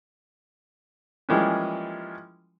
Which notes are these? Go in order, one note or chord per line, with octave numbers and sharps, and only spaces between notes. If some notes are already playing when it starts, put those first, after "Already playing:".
E3 F3 G3 G#3 A#3 C#4